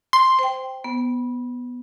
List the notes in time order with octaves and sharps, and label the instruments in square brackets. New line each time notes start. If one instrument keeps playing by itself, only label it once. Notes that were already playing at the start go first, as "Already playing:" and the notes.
[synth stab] C6
[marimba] C5 G5
B3